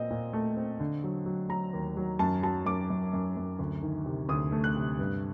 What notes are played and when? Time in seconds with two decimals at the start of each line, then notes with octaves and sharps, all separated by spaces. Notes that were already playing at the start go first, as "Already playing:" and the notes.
Already playing: A#2 C4 D#5
0.10 A#2
0.33 A3
0.57 C4
0.80 D3
1.04 F#3
1.26 F#3
1.49 F#3 A#5
1.73 D#2
1.97 F#3
2.19 F#2 A5
2.43 F#3 A5
2.66 F#2 D6
2.90 F#2
3.13 F#2
3.37 F#2
3.59 D2
3.82 D#3
4.06 C3
4.29 D2 D#6
4.52 A3
4.64 F#6
4.76 C3
4.99 G2